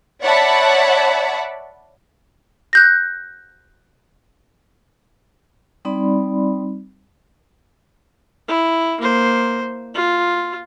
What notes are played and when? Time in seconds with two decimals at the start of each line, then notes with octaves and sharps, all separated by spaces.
0.23 C#5 D5 E5 F#5 A5 B5
2.73 F#6 G6 A#6
5.85 G3 C4 D#4 D5 B5 C6
8.48 E4
9.00 A#3 C5
9.94 F4